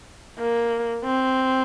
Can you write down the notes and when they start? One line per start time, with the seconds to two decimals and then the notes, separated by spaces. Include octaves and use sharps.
0.39 A#3
1.04 C4